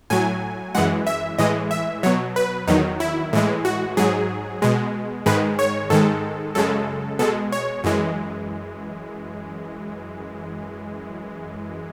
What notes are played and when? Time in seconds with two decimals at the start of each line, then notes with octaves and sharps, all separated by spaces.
0.10 A2 F#3 G#5
0.75 F#2 E3 G#3 F#5
1.07 E5
1.38 A2 E3 G#3 D#5
1.71 E5
2.03 B2 F#3 C#5
2.36 B4
2.68 E2 D#3 F#3 D#4
3.00 E4
3.33 A2 E3 G#3
3.65 F#4
3.97 G#2 F#3 G#4
4.62 B2 G#3
5.26 G#2 D#3 G#3 B4
5.59 C#5
5.90 G#2 D#3 G#3 A4
6.55 F#2 C#3 G#3 A4
7.19 B2 G#3 A4
7.52 C#5
7.84 F#2 E3 G#3